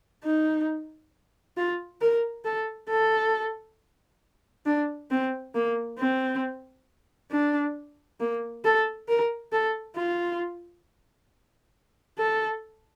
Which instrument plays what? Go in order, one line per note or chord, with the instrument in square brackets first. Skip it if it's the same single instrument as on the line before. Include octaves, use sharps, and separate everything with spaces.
[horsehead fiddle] D#4
F4
A#4
A4
A4
D4
C4
A#3
C4
D4
A#3
A4
A#4
A4
F4
A4